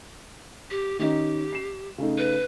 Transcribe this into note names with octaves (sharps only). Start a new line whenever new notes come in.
G4
D#3 C#4 D#4 G4
C7 E7
C#3 A3 D#4
B4